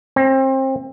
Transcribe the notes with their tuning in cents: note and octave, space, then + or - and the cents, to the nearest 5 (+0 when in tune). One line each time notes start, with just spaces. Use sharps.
C4 +30